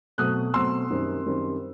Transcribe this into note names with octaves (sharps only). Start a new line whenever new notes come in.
B2 F#3 A3 C4 D#6 F#6
B2 F#3 A3 C4 C6 E6
F#2 D#3 G3 C4
F#2 D#3 G3 C4